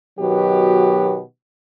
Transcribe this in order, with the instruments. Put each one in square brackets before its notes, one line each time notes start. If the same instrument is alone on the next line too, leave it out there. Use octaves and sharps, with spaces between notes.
[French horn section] B2 D#3 F#3 B3 F#4 G4